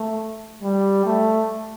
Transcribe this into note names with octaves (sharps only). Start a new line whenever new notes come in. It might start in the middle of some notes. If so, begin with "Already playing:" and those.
Already playing: A3
G3
A3